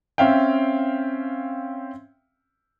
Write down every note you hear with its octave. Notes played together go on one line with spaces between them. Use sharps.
C4 C#4 E5 F5 G5